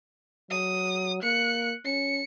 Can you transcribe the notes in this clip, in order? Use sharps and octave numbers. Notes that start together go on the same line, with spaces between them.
F#3 D#6
A#3 F#6 C#7
C#4 C#7